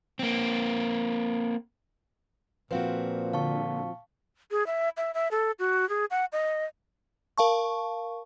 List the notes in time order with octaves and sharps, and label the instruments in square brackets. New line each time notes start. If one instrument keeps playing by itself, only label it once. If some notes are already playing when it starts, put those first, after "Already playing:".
[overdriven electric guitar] A#3 C4
[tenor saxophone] A#2 [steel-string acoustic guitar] F3 C4 F#4 [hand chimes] B4 C5 F5
[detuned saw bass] D3 [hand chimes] F5 A5 C#6
[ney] G#4
E5
E5
E5
A4
F#4
G#4
F#5
D#5
[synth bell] A#4 F5 A5 C#6